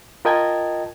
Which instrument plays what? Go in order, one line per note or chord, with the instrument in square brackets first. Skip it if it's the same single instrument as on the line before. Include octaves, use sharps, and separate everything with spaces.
[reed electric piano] F4 A#4 D#5 G5 A5 G#6